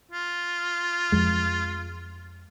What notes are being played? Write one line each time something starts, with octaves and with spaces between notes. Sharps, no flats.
F4
F2 G#3